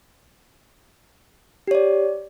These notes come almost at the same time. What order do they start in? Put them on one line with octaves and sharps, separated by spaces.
G4 C#5 D5